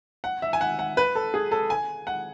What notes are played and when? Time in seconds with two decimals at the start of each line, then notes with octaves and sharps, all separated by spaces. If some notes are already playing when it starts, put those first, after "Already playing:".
0.24 F#5
0.42 E5
0.53 G#5
0.61 F#5
0.79 F#5
0.97 B4
1.15 A4
1.34 G#4
1.52 A4
1.70 G#5
2.07 F#5